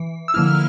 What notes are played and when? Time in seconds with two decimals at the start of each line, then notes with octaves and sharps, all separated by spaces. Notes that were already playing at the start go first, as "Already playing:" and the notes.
Already playing: E3
0.28 E6
0.34 D3 F3 A#3 E4 F6